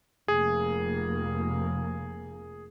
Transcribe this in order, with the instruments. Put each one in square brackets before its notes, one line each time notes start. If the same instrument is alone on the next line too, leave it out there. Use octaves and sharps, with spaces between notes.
[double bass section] F1 A#3 [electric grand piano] G#4